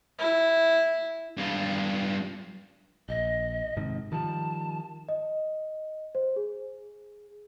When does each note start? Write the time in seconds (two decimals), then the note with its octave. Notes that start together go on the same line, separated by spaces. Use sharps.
0.19 E4
1.38 G2 F4
3.09 A#1 D#5
3.77 G#2 C3 D#3
4.12 D#3 F3 G3 A5
5.09 D#5
6.15 C5
6.36 G#4